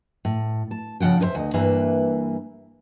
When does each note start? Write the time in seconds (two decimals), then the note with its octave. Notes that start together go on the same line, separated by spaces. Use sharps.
0.25 A2
0.71 A5
1.00 C#3 F3 B3 F#5 G5
1.19 F2 E4 B4 C5 E5
1.35 D2 D#5
1.54 G2 E3 A#3 B4 E5